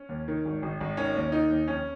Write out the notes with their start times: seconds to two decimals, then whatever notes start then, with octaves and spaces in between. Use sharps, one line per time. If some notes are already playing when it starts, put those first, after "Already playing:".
Already playing: C#4
0.09 D#2
0.28 D#3
0.45 G#1
0.62 G#1
0.80 G#1
0.97 D#3 C#4
1.16 D#2
1.32 D#3 D#4
1.50 D#2
1.68 F2 C#4